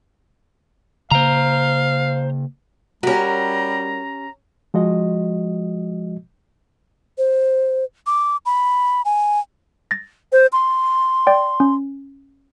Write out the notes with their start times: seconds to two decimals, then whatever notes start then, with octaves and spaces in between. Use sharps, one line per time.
1.11 C#3 A#3 C5 F5 A#5
3.03 G3 C#4 F#4 G4 A#4 A#5
4.74 F3 G#3 F#4 D#5
7.18 C5
8.07 D6
8.46 B5
9.05 G#5
9.91 A6 A#6
10.32 C5
10.53 C6
11.27 D5 G5
11.60 C#4